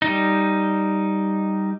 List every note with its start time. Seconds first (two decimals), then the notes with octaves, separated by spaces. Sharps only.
0.02 G3 D#4